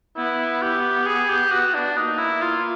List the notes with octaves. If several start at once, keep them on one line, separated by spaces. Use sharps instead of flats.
B3 E4
G4
G#4
G4
F#4
D4
A#3 D#4
E4
F4